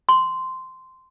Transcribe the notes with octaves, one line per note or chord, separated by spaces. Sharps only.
C6